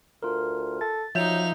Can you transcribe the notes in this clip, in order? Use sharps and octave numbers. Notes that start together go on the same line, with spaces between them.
D2 F4 A#4
A4 A6
F3 F#3 D#4 E5 G6 F7